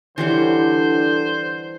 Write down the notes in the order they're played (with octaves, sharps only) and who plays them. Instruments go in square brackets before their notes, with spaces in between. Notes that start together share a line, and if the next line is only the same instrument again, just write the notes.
[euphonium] D3 [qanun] E3 G3 C#5 [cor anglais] C5